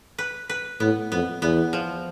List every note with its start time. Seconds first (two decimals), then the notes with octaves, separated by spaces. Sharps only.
0.18 B4
0.49 B4
0.80 A2 B3
1.12 F2 B3
1.42 E2 B3
1.73 F3